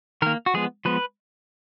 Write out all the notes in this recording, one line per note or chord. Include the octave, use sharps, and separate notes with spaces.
D#3 A#3 A#4
F#4
F3 G#3 B3 G#4
F3 G#3 B3 B4